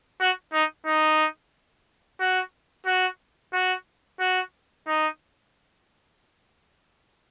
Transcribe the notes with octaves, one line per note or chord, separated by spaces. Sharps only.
F#4
D#4
D#4
F#4
F#4
F#4
F#4
D#4